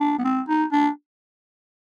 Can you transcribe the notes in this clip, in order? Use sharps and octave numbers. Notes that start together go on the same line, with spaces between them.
D4
B3
C4
D#4
D4